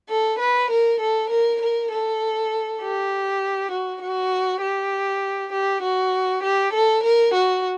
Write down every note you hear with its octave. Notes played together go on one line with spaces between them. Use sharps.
A4
B4
A#4
A4
A#4
A#4
A4
G4
F#4
F#4
G4
G4
F#4
G4
A4
A#4
F#4